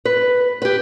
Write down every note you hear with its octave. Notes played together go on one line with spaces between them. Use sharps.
B4
G4 B4